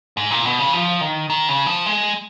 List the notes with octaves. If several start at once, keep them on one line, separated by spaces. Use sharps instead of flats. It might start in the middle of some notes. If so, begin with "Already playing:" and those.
G#2
A#2
B2
C#3
F3
D#3
D#3
C#3
F3
G#3